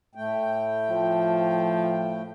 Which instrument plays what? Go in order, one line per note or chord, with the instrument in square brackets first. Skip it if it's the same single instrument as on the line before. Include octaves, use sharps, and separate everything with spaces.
[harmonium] A2 A3 G5
[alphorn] F3